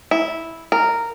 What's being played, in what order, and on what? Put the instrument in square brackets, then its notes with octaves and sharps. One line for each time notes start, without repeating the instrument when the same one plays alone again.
[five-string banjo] E4
A#4